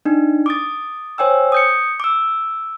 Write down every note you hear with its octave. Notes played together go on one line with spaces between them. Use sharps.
D4 D#4
D6 D#6 A6
C5 C#5 G5 G#5 E6
D#6 G6 C#7
D6 E6